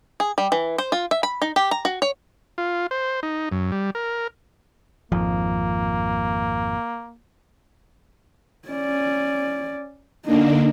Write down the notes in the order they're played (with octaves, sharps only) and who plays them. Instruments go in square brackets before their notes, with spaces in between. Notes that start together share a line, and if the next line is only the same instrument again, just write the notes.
[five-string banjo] G#4
G3
E3
C5
F4
E5
B5
D#4
G4
A#5
F#4
C#5
[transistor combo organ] F4
C5
D#4
F#2
G3
A#4
[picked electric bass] G#1 F2 F3 [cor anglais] A#3
[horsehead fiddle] C#4 D5
[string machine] D3 A#3 D4 [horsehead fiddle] D#4